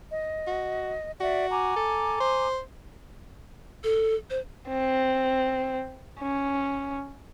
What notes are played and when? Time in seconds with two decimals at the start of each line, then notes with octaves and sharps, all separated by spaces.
0.11 D#5
0.47 F#4
1.20 F#4 D5 E5
1.51 G#5 A#5 D6
1.76 A4
2.20 C5
3.84 A4
4.30 C5
4.68 C4
6.19 C#4